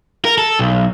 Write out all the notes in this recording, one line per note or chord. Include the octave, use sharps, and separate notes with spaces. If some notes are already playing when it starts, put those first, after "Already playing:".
A#4
A4
B1